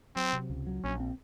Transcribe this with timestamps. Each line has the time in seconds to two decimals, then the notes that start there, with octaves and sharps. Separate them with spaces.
0.16 F#3 C4
0.33 C3
0.50 C#2
0.67 F#3
0.84 A#1 C#4
1.00 C4